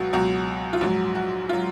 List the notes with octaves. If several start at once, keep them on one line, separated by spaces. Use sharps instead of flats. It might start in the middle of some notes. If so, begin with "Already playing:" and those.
Already playing: C#2 B2 F#3 F#4
C#2 B2 F#3 F#4
F4
A#1 G#2 F#3 F#4
F#4
F#3 F4